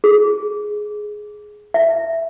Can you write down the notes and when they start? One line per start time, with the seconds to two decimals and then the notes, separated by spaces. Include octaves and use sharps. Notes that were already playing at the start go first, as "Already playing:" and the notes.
0.04 G#4
1.74 E5